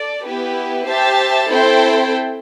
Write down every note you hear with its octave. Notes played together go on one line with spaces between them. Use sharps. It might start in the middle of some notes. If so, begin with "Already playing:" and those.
Already playing: A4 D5
B3 E4 G4 B4
G4 C5 E5 A5
C4 E4 A4 C5 G5